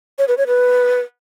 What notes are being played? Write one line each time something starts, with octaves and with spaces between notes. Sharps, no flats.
C#5
B4
C#5
B4